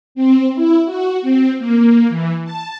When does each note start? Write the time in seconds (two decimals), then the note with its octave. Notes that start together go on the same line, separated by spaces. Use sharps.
0.15 C4
0.55 E4
0.86 F#4
1.22 C4
1.59 A#3
2.09 E3
2.45 A5